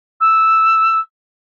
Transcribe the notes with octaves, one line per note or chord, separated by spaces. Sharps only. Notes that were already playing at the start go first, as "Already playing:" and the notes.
E6